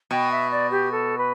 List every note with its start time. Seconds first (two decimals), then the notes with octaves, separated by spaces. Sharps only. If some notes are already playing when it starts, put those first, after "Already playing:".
0.11 B2 G5
0.31 E5
0.51 D5
0.71 G4
0.91 A4
1.18 B4